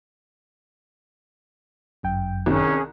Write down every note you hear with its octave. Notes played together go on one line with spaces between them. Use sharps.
G1 F#2 G5
C2 D#3 C#4 G#4